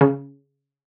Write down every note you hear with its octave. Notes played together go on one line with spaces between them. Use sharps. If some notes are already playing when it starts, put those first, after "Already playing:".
C#3